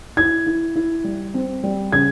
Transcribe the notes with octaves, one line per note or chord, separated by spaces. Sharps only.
E4 G#6
E4
E4
G3
C4
G3
C#3 G#6